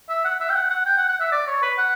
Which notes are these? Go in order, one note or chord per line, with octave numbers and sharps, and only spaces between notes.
E5
F#5
E5
G5
F#5
F#5
G5
F#5
F#5
E5
D5
C#5
B4
F#5